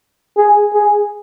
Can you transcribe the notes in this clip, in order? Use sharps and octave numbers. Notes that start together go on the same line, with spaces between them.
G#4
G#4